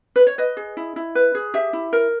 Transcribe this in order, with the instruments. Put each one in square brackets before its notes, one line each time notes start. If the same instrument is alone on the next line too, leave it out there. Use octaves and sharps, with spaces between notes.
[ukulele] B4
C#5
B4 D#5
G#4
E4
E4
B4
G#4
G4 E5
E4
A#4